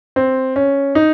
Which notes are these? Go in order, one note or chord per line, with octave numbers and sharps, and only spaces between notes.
C4
C#4
D#4